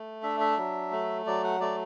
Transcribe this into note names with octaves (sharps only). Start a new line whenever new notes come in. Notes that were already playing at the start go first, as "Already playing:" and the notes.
Already playing: A3
D4 E5
E5
F#3
A3
F#3 D5
F#5
A3 D5